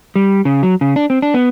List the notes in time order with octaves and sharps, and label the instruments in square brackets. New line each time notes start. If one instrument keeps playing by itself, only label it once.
[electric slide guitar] G3
C#3
F#3
C#3
D4
C4
D4
B3